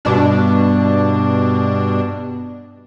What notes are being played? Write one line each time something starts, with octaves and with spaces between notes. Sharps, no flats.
G2 B2 D4